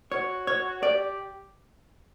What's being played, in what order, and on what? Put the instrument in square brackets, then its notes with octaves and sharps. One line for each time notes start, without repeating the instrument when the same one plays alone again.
[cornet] F#4 [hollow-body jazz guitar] C#5
[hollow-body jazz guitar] C#5
[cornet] G4 [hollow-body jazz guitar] D5